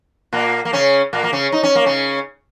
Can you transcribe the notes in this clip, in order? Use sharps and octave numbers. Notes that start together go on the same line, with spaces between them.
A#2 A#3
A#3
C#3 C#4
A#2 A#3
A#3
C#3 C#4
D#4
C#4
A#3
C#3 C#4